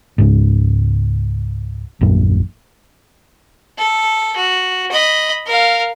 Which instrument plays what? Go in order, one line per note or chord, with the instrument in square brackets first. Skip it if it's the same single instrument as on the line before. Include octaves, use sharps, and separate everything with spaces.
[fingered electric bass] C#2 G#2
D#1 A#1 F#2
[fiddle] A4
F#4
D#5 B5
A#4 F5